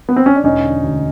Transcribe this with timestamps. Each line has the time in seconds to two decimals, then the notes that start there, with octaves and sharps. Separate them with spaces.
0.09 B3
0.16 C4
0.26 C#4
0.36 D4
0.44 E1 C#4 D#4
0.63 D3
0.83 D2